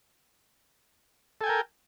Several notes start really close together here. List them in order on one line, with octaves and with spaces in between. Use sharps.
A4 G#5 G5 A#4